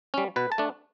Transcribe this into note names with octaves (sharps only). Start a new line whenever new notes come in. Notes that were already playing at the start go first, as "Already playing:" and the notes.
G3 C#4
B2 B4
A5
A3 D4